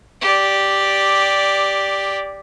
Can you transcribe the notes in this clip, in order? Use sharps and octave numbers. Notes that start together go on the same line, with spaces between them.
G4 D5